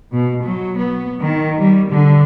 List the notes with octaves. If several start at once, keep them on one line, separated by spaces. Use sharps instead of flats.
B2
F#3
B3
D#3
G3
D3